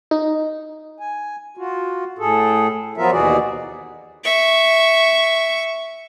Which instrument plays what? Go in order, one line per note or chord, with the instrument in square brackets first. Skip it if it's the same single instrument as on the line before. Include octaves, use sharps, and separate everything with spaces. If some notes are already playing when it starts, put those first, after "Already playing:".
[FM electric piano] D#4
[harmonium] G#5
F4 F#4
A2 G#4 A4
F3 F#3 B3 F4 A#4 E5
D#2 B2 E3 F#4 G#4 D5
[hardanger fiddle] E5 C#6